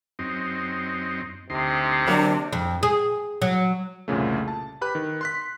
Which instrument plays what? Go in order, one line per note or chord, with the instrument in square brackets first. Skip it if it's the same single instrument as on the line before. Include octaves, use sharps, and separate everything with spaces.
[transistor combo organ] F#2 C4 D#4
[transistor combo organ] D2 D#4 C6 [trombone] C3
[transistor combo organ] D3 [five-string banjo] F#3 A#3 [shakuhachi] D4
[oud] F2
G#4
F#3
[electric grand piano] C2 F2 A#2 C#3 A3
A5
G4 B4 B5 F#6
D#3
C6 F#6 B6